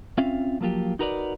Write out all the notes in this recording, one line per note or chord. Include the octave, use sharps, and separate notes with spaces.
C4 C#4 F4 E5 F5
F3 F#3 A#3 F4 G4
D#4 F#4 A#4 B4 C#5 D5